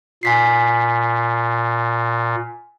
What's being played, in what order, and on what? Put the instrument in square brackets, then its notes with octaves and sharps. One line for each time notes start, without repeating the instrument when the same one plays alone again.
[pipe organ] A#2 [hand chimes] G#5 B6 C7